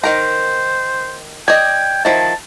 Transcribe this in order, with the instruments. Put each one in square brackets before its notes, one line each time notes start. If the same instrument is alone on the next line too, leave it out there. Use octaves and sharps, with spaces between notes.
[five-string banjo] D#3 A#4 A#5 [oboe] C5
[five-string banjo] D5 D#5 [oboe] G5 [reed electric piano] G#6
[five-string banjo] D#3 F3 E4 [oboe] A5